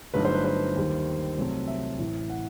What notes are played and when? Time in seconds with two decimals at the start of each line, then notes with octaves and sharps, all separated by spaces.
0.14 G1 G2 F#3 A3 D#4 B4
0.25 C5
0.35 B4
0.44 C5
0.76 D#2 D#3 G3
1.38 C2 C3 F#3 A3 C4
1.68 E5
1.98 A1 A2 E3
2.30 F#5